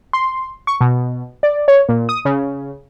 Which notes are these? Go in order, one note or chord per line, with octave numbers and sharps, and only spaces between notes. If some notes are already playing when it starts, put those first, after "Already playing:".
C6
C#6
B2
D5
C#5
A#2
D#6
C#3